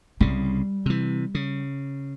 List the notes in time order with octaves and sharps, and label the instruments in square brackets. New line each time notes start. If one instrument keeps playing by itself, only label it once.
[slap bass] C2 C#3 [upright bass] G3
[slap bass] C3 E3
C#3